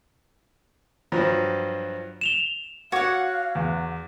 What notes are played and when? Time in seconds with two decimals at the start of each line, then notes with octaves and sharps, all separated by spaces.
1.12 G2 F3 F#3
2.21 E7 F7 G7
2.92 F#4 C#5 F5 F#5 D6 G#6
3.55 E2